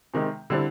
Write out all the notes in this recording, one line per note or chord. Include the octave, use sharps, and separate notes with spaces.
C3 D#3 G#3
D3 G3 C4 E4